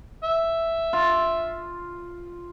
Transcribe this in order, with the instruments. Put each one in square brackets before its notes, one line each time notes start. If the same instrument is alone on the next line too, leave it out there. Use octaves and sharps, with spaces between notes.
[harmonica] E5
[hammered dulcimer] F4